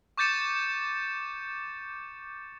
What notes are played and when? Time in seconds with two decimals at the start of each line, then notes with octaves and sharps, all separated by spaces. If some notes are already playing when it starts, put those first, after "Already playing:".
0.18 C#6 D6 G6 A6 C#7 E7